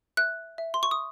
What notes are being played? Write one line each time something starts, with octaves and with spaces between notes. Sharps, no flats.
E5 F#6
E5
C6
C#6
D#6